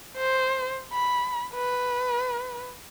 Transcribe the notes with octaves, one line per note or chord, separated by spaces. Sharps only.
C5
B5
B4